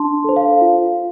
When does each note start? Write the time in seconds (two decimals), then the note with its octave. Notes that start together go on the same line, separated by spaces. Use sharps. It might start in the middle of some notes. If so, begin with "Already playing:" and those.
Already playing: D4 A5 C6
0.24 A4 C5
0.36 F5
0.61 F4